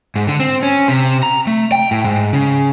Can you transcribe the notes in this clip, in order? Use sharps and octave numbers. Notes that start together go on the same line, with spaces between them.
G#2
D3
C4
C#4
C3
A#5
A3
G5
A2
G#2
C#3